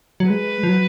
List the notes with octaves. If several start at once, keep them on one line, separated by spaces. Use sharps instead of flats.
F#3
G#3 B4
F3
F#3